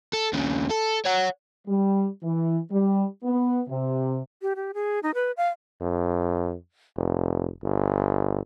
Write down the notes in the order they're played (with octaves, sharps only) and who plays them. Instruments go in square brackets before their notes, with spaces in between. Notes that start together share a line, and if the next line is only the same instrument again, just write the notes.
[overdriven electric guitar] A4
D#2 C#3
A4
C#5 F#5
[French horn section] G3
E3
G3
B3
C3
[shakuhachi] G4
G4
G#4
D#4
B4
F5
[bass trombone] F2
F1
G1